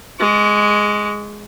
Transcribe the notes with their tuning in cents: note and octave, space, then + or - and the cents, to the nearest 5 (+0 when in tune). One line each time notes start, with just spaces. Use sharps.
G#3 +0 C#6 +40